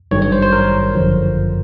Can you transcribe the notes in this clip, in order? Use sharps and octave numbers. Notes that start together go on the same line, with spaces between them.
G#1 G2 D#3 F#3 C#5
C#5
C5
C5
A#4
G1 F#2 D3 F3